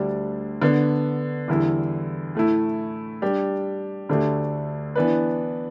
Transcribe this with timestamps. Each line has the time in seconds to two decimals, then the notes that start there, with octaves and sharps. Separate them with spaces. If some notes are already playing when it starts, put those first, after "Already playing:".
Already playing: D2 D3 G3 D4 G4
0.62 D3 B3 D4
1.48 E2 D3 G3 E4
2.35 A2 A3 E4
3.22 G3 D4 G4
4.09 D2 D3 A3 D4 G4
4.95 E3 B3 D4 B4